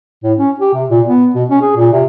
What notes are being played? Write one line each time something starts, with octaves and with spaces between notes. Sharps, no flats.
A2
C#4
G4
C3
A#2
B3
B2
C#4
G#4
A#2
C3